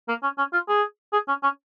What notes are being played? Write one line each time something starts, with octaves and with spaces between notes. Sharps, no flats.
A#3
C#4
C#4
F4
G#4
G#4
C#4
C#4